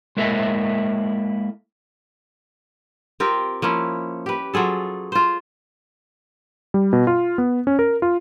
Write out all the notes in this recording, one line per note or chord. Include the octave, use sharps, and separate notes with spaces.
G#3 A#3 E4 A4 D#5 E5
C4 F4 G4 A#4
F3 A#3 C#4 E4
G4 B4
F#3 F4 G#4 A4
F4 C5
G3
B2
F4
B3
C#4
A#4
F4